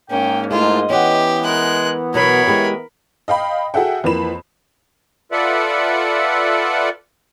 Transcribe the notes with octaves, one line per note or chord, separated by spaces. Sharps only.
G#2 A#3 C#4 G5
A3 E4 F4 G#4 D#5
E3 B3 C#4 G4 F#5
G#3 A#4 F#6
B2 F#3 A#4 B4 C#5 B5
G#3 E4 G4
D#5 F5 G5 B5
F#4 G#4 A4 E5 F#5 G5
F2 E3 A#3 B4 B5 E7
F4 A4 B4 D5 E5 F#5